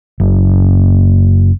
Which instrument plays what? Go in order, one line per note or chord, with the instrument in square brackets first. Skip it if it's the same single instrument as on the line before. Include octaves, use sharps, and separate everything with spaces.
[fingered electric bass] F#1